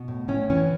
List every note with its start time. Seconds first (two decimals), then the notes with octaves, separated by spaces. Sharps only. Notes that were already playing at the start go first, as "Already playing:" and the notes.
Already playing: B2
0.08 A2
0.28 A2 C#4
0.50 E3 C#4